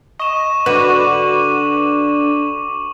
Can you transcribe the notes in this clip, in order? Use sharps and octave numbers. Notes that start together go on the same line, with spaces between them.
D#5 C#6 E7
D3 F#4 B4 D6 D#7 F#7